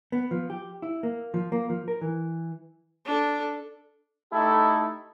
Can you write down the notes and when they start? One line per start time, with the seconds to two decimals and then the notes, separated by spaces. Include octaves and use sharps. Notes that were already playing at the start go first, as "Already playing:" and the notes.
0.12 B3
0.31 F3
0.50 G4
0.82 E4
1.03 A#3
1.34 F3
1.52 A#3
1.70 F3
1.88 A#4
2.01 E3
3.05 D4 A4
4.33 A3 D#4 E4 G4 A4